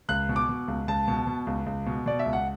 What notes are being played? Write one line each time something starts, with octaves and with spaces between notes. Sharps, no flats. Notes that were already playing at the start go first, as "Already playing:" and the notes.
C#2 F#6
B2
D6
B2
C#2
C#2 A5
B2
B2
C#2
C#2
B2
B2 D5
E5
C#2
F#5